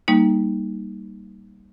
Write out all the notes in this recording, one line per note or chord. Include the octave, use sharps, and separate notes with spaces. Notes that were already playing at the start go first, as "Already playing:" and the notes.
G3 A#3 D#4